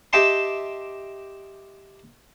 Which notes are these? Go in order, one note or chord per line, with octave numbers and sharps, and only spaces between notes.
G4 D#5 E5 G5 A5 C6